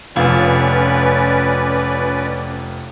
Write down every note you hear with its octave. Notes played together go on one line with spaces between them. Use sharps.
F1 C#4 F4 B4 D5